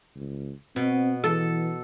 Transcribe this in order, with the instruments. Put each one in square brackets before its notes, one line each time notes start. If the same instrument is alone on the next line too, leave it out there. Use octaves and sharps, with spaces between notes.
[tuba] C#2
[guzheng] B2 [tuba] C4
[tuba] E3 [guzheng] A4